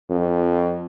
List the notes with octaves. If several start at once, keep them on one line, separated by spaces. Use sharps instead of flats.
F2